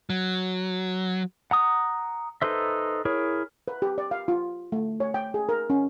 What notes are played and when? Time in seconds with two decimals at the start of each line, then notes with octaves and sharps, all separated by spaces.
0.10 F#3
1.51 F#5 A#5 D#6
2.42 D#4 A4 B4 C5 E5
3.05 E4 G#4 A#4 C#5
3.68 B4
3.82 G4
3.98 D5
4.11 F5
4.28 F4
4.72 A3
5.00 C#5
5.14 G5
5.34 G#4
5.49 A#4
5.70 C#4